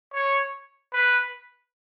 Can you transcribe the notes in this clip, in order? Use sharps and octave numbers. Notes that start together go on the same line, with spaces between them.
C#5
B4